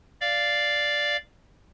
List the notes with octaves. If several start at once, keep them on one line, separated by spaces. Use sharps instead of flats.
D5 F5